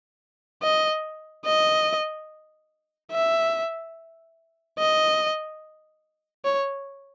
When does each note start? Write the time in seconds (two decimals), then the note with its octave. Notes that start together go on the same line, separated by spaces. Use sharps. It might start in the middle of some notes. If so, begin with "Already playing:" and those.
0.62 D#5
1.46 D#5
3.12 E5
4.79 D#5
6.45 C#5